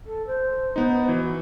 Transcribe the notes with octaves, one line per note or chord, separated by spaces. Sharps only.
A4
C5
B3 D#4
E3 F#4